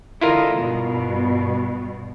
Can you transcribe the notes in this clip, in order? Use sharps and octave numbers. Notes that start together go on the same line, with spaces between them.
D3 E4 F4 A4 A#4 D#5
G2 B2 B3